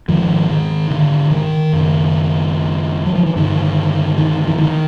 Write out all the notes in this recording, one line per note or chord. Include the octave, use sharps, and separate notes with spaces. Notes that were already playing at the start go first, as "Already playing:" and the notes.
G#2 D#3 F3
D#3
D3
D#3
F#2 C#3
F#3
F3
E3
G2 D3 D#3
D#3
E3
D#3